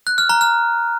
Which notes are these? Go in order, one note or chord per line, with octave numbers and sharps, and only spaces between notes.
F#6
F6
A#5
F6